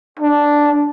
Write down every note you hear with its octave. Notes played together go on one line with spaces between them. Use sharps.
D4